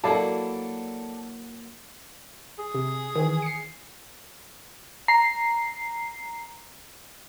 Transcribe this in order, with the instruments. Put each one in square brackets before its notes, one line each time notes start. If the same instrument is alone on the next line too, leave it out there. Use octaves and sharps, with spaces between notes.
[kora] F#3 A#3 E4 [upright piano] A4 D5 A5
[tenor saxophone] G#4
[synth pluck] C3
D#3 E3
C7 C#7
[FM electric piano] A#5 C7